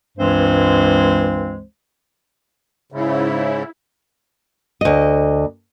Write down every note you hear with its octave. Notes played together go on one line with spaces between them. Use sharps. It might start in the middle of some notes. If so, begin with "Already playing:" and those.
C#2 G2 E3 G#3 C4 C5
G#2 C#3 E4
D2 D#5